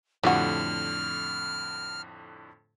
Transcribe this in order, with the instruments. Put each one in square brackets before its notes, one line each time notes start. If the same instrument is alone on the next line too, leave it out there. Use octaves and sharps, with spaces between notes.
[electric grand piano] F2 A2 D3 [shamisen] G3 F4 F#4 [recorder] F6